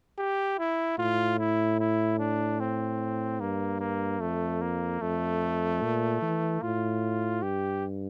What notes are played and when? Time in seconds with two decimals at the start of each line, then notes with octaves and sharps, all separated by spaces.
0.19 G4
0.59 E4
0.98 A2 F4
1.39 E4
1.80 E4
2.19 D4
2.60 C4
3.40 G2 A#3
3.80 A#3
4.20 F2 A3
4.62 A#3
5.01 F2 A3
5.82 A#2
6.22 E3
6.62 A2 F4
7.42 G2 G4